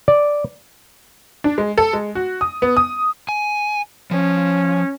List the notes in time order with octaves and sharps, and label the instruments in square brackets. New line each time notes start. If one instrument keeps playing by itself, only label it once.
[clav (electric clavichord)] D5
[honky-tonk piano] D4
G#3
A4
G#3
F#4
D#6
B3
D#6
[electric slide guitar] G#5
[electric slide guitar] F3 [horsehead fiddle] C#4